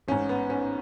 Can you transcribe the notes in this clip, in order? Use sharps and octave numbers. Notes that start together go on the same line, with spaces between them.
A1 G#2 C#4
B3
C#4